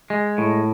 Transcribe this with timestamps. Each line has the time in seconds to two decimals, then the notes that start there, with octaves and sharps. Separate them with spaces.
0.10 G#3
0.38 A2